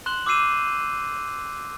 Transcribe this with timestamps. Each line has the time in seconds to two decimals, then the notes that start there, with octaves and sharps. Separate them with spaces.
0.06 C6 F#6 E7 F#7 G7
0.26 D6 E6 G6 C7 D#7 E7